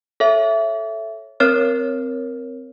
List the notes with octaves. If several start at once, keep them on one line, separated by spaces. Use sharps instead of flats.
A4 C#5 E5
C4 A#4 C#5 F6